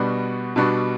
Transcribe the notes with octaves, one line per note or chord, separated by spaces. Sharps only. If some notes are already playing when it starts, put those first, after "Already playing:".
Already playing: B2 G3 B3 D4 F#4
B2 G3 B3 D4 F#4